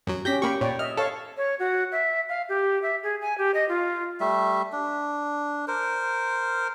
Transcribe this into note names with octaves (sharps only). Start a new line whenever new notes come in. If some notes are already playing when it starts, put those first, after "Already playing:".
F#2 F#3
C#4 G4 G6 A#6 B6
A#3 G4 B5 C#6
A#2 C#5 D5 G5
D#5 E5 F6
A4 C#5 F5 A5
C#5
F#4
E5
F5
G4
E5
G#4
G#5
G4
D#5
F4
G3 A3 E5
D4
A#4 C5